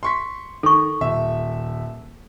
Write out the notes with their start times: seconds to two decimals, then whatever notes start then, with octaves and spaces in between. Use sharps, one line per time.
0.03 C6 C#6 B6
0.63 D#3 A4 C#6
1.01 D#1 E5